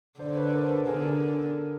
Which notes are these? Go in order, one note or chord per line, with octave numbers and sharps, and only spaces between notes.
D3 C5 D5
B4 C#5
C#5
A#4 C5
A4 B4
D3 G#4 A#4
G#4 A#4